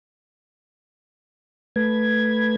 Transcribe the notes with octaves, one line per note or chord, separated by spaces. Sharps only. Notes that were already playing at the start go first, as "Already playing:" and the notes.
A3 B4 G#6